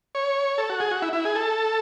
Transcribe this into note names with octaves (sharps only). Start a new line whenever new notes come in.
C#5
A4
F#4
G#4
F#4
E4
E4
G#4
A4